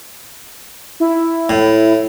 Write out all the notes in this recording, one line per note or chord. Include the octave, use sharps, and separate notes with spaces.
E4
A2